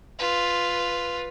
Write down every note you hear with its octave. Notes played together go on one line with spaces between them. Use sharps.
F4 B4